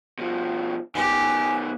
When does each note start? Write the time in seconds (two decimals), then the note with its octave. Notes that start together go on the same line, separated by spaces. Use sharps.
0.19 B2 F3
0.95 D#3 B3 G4 G#5